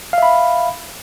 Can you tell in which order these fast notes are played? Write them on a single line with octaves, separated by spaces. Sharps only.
F5 E5 B5